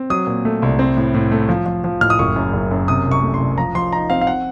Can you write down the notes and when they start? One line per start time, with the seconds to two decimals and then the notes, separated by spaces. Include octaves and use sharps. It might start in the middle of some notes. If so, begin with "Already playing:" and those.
Already playing: C4
0.10 F#3 D#6
0.27 A#2
0.45 A3
0.62 C2
0.79 C4
0.97 A2
1.14 A2
1.32 A3
1.49 F3
1.66 F3
1.84 F3
2.01 A2 F6
2.10 D#6
2.19 F#1 C#6
2.36 F#2
2.53 F#1
2.71 F#2
2.88 C3 D#6
3.06 C2
3.12 C#6
3.23 A3
3.34 C6
3.40 C2
3.58 F3 A#5
3.75 F3 C6
3.93 D#4 A#5
4.10 C4 F5
4.21 F5
4.27 F#5